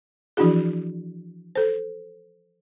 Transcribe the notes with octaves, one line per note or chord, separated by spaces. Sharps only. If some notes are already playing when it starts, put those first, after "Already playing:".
E3 F3 D4 E4 F#4 G#4
A4 C5